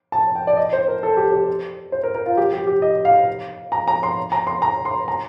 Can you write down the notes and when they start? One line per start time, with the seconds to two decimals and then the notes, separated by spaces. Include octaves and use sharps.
0.12 A5
0.35 G5
0.47 D5
0.57 D#5
0.73 C5
0.88 A#4
1.03 A4
1.17 G4
1.32 G4
1.92 C5
2.04 A#4
2.15 A#4
2.26 F4
2.37 G4
2.53 G4
2.67 G4
2.82 D#5
3.05 F5
3.72 A#5
3.88 A#5
4.03 C6
4.32 A#5
4.47 C6
4.62 A#5
4.85 C6
5.08 A#5